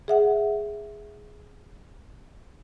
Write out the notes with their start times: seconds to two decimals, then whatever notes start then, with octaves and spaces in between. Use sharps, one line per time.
0.08 G#4 E5 F#5